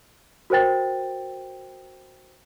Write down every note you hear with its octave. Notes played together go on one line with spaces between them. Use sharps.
F#4 A#4 C5 G5 A6